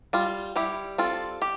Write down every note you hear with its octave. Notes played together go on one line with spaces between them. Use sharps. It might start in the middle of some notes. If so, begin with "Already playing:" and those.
G3 F4
G3 E4 G4
C4 F4 A4
G4